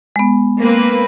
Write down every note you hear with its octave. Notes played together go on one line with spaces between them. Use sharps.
G#3 B3
A#3 C4 B4